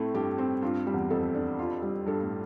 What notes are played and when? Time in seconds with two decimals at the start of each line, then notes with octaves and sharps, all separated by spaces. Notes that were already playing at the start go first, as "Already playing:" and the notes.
Already playing: A2 A3 C4 E4
0.14 G2 G4
0.38 C4
0.62 G2 F4
0.87 G3
0.94 E2
1.10 F2 A4
1.34 D4
1.59 F4
1.82 G3
2.06 G2 A4
2.23 A2